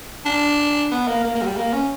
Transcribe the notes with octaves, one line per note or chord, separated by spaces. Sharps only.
D4
B3
A#3
A#3
A#3
F#3
G3
A#3
C#4